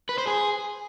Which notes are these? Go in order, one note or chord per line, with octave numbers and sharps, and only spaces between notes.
B4
C5
G#4